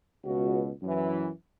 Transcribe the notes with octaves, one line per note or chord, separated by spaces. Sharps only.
C#2 B2 F#4
F#2 E3